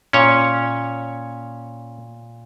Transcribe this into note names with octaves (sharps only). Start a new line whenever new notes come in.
A#2 C#4 C#5